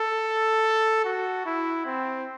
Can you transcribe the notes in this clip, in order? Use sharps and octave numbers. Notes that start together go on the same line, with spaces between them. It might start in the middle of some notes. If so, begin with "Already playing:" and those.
Already playing: A4
F#4
E4
C4